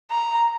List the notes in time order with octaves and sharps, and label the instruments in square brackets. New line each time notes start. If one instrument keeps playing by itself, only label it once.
[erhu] A#5